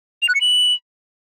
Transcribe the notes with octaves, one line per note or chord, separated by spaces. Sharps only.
F7
F#6
C#7
F#7